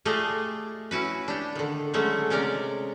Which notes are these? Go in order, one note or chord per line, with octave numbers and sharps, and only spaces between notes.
A3 F4 G4 G#4 D5 D#5
C#4 E4 F#4 B4
D4 G4
D3 D#3
D3 F#3 G#3 A3 C#4
C3 G#3 C#4 A#4 D5